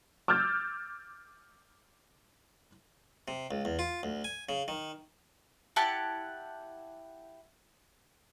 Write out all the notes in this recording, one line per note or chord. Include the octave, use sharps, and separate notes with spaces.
D6 E6 F6 G6 A6
C3
C#2
E2
F4
D2
G#5
C#3
D#3
E4 G4 F#5 A5